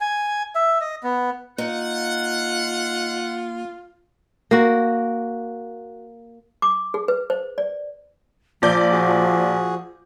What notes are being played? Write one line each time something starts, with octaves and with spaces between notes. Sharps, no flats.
G#5
E5
D#5
B3
A#3 D#4 F4 F#5
A#3 F#4
D6
G#4
B4
C5
D5
A#1 F3 D5 G6
F#4 G#4